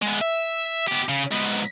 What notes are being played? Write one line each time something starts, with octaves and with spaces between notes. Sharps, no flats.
G#3 B3
E5
B3 G4
C#3
G#2 B3